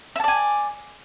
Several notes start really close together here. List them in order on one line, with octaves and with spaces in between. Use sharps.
E5 A5 D5 G#5